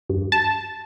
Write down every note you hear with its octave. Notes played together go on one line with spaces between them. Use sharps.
G2
A5